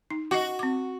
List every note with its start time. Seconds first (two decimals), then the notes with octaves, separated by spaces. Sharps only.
0.10 D#4
0.31 F#4 D#5 D6
0.59 C4 D6